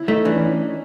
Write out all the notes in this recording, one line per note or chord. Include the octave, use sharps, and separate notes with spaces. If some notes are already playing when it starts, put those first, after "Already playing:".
Already playing: E4
A3 D#4
E3 D4
C#4